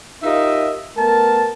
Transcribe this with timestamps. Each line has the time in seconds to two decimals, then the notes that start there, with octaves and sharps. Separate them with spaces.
0.23 D#4 F4 G4 A#4 D#5 E5
0.96 A3 B3 A#4 A5